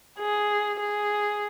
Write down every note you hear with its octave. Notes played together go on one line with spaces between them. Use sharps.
G#4
G#4